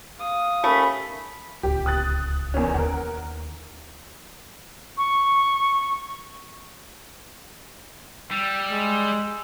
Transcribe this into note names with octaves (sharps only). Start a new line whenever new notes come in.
F5 D#6
D#2 A3 C#4 B5
D1 C#2 G4
D#6 F#6 A6
E2 A#3 C#4
D#2 A#4 F#5
C#6
G3 E6
G#3